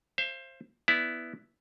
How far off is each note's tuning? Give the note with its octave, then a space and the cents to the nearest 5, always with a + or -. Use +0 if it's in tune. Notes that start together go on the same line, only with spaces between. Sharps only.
C5 +20 F5 -40
B3 +0 E4 +0 D5 +0